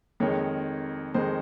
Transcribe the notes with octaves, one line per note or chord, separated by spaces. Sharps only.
F2 D#3 G#3 C#5
F2 D#3 G#3 C5